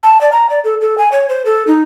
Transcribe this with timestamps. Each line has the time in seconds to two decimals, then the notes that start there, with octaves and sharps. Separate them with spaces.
0.03 A5
0.21 D5
0.32 A#5
0.50 D5
0.64 A4
0.81 A4
0.98 G#5
1.12 C#5
1.29 C5
1.46 A4
1.67 D#4